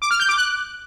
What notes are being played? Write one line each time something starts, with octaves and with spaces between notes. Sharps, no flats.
D6
F6
G6
D6
F#6